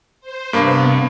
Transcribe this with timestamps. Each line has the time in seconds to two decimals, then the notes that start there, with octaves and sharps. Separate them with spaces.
0.21 C5
0.53 G2 C3 A#3 B3